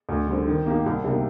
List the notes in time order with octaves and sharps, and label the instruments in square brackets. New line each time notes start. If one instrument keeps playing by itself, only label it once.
[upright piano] D2
D3 G3 C4
D#3
A#3 D#4 G4
C2
C3 G3 A#3 D#4